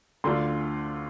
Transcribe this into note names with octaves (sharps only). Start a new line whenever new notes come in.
D2 D3 A3 D4 F4 C6